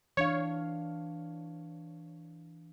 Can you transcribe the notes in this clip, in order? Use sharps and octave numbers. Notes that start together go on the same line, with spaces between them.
E3 D4 C#5 F5